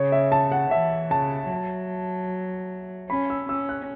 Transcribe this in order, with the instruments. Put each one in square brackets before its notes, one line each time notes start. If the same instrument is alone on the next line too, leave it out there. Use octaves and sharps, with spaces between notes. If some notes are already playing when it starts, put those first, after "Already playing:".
Already playing: [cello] C#3 [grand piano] C#5
[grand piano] E5
A5
F#5
[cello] E3 [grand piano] E5
[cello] C#3 [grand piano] A5
[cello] F#3
[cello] C#4 [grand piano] B5
[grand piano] E6
[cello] C#4 [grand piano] E6
[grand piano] F#6